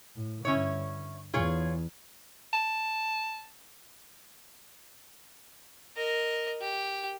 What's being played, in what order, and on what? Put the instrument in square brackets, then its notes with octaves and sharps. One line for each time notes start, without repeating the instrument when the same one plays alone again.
[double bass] A2
[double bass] G2 D3 [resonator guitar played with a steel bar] C#4 E4 C#5
[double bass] E2 E3 [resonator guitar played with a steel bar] F4 G#4 C#5
[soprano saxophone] A5
[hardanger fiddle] A#4 D#5
G4